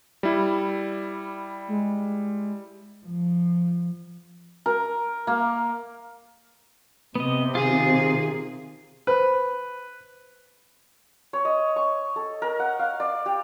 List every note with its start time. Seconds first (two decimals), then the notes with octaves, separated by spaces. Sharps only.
0.23 G3 E4 D5
1.68 G#3
3.06 F3
4.66 A#4
5.27 A#3
7.15 C3 B3 D#5
7.55 D#3 F4 G#4
9.07 B4 C5
11.33 C#5
11.45 D#5
11.76 C#6
12.16 A4
12.42 A#4
12.60 F#5
12.79 F5
13.00 D5
13.26 G4